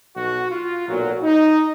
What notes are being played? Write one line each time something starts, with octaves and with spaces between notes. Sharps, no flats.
B1 B2 F#3 F#4
F4
B1 A#2 F#3
D#4